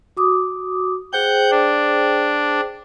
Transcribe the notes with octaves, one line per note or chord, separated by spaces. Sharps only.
F#4 D6 D#6
G#4 C5 F#5 G5 G6
D4